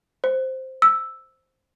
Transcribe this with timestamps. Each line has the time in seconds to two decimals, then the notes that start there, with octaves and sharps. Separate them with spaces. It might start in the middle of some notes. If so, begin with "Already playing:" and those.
0.24 C5
0.82 E6